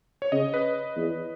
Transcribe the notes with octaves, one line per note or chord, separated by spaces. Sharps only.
C#5
C#3 D#5
B4
E2